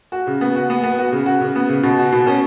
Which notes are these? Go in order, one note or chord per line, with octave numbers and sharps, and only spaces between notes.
F#4
C#3
B3
F#4
B3
B3
F#4
C#3
F#4
C#3
B3
C#3
B2
F#4
B2
C#4